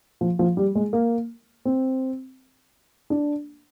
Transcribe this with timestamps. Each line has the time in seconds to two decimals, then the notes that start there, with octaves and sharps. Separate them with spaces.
0.21 F3
0.39 F3
0.57 G3
0.75 G#3
0.93 A#3
1.65 C4
3.10 D4